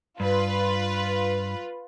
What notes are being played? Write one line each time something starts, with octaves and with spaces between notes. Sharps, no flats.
G2 F4 B4